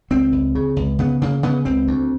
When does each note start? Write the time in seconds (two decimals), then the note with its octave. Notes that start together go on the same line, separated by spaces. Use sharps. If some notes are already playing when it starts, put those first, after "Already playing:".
0.10 C#2 C4
0.32 C#2
0.55 C#3
0.76 C#2
0.99 C#3 B3
1.22 C#3 A#3
1.43 C#3 B3
1.65 C#2 C4
1.87 D2